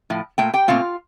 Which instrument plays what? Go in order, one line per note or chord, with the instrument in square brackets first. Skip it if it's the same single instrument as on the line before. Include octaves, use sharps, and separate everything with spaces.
[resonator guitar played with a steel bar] A2 F3
A#2 A3 G5
G4 G5
A#2 A3 C4 F4 F5